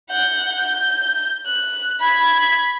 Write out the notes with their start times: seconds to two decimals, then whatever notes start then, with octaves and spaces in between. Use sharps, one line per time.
0.10 F#5 G6
0.59 G6
1.47 F#6
2.01 B5 G#6